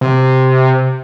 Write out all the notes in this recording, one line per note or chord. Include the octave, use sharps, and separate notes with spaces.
C3